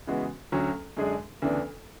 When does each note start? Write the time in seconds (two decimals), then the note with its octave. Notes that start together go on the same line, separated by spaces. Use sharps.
0.07 C#3 E3 G#3 B3 F#4
0.52 D2 D3 F#3 C#4
0.97 F#2 D3 G#3 D4 G#4
1.42 D2 C#3 E3 B3 D4